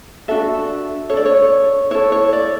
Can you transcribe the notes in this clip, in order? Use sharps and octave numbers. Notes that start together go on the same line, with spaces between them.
D4 F#4 A4 E5
D4 A4 C#5 D5
C#5
E4 A4 C#5
C#5
D5